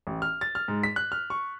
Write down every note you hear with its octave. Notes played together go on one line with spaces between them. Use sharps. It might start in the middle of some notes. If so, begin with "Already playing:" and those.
A1
F6
A6
F6
G#2
B6
F#6
F6
C#6